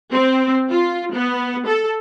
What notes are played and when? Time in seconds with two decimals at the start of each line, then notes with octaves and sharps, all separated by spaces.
0.12 C4
0.71 F4
1.14 B3
1.67 A4